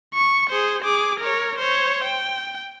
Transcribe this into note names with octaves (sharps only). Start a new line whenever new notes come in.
C#6
G#4 C5
G#4 D6
A#4 C#5
C5 C#5
G5